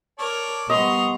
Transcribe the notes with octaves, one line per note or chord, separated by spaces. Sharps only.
A4 A#4 C#5 D5
G3 B3 D#5 A#5 C6 C#6